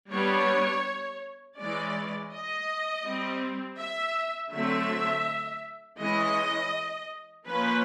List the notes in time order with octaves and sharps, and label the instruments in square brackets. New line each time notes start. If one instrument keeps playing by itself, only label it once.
[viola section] G3 B3 D4 C#5
E3 G#3 C#4 D5
D#5
G3 C4
E5
D3 F#3 A3 C4 E5
E3 G#3 C#4 D#5
F3 A#3 C#4 B4